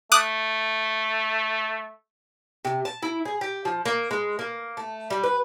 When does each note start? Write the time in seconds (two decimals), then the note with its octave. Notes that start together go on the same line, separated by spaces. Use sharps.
0.12 A3 D6 D#6 F#6
2.65 C3
2.85 A5
3.03 E4
3.25 G#4
3.41 G4
3.65 F3
3.85 A#3
4.11 G#3
4.39 A#3
4.77 A3
5.10 G3
5.24 B4